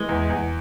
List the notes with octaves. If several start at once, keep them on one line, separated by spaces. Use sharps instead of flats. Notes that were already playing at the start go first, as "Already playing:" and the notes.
Already playing: E3 G#3
E2
E2